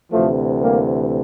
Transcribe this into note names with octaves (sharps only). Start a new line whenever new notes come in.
D2 C3 E3 F3 A3
G3 A#3